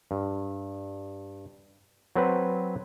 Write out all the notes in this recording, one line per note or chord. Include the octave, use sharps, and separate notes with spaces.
G2
F#3 C4 B4